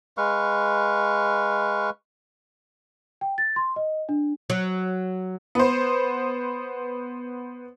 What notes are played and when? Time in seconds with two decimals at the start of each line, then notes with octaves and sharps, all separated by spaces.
0.17 G#3 B4 F5 C#6
3.21 G5
3.38 A6
3.56 C6
3.76 D#5
4.09 D4
4.50 F#3
5.55 B3 C5